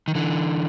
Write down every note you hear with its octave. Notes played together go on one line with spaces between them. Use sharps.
D#3
D3 E3